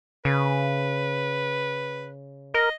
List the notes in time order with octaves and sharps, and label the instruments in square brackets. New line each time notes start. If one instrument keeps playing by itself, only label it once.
[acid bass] C#3 [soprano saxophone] B4
[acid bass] A#4 [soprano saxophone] D#5